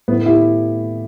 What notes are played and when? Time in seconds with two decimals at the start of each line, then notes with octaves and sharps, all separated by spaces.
0.08 A2 B3
0.26 E4 G4